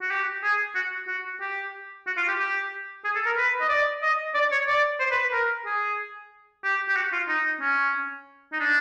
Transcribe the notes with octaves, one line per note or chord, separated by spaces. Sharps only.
F#4
G4
G#4
F#4
F#4
G4
F#4
F4
G4
G4
G#4
A4
A#4
B4
D#5
D5
D#5
D5
C#5
D5
C5
B4
B4
A#4
G#4
G4
G4
F#4
F4
D#4
C#4
D#4
D4